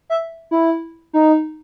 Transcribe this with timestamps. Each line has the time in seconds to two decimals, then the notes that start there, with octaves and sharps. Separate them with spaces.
0.10 E5
0.51 E4
1.13 D#4